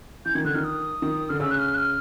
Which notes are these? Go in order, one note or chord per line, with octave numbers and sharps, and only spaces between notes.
E3 G6
D#3 G#6
D3 F#6
D#3 F6
D#6
D#3
D3 F6
C#3 E6
F#6
F6
F#6
F6